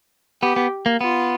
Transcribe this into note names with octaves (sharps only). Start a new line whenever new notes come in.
B3 G4
B3
A#3
B3 F4